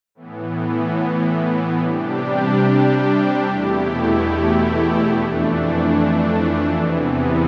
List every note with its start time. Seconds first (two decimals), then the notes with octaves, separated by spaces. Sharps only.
0.15 A2 E3 B3
1.80 C3 G3 D4 G4
3.44 E2 B2 A3 E4 G4
5.10 F2 E3 A3 D4
6.74 E2 C3 E3 B3